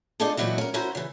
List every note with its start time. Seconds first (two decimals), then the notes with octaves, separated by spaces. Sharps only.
0.20 C4 D4 D#4 F4 G#4 A4
0.37 A#2 E3 F#3 D#4 E4 F#4
0.58 C#4 A#4
0.74 C#4 E4 F#4 C5 G#5 A#5
0.95 C#3 E3